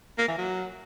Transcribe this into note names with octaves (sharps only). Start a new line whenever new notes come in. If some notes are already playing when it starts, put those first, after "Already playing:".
A#3
E3
F#3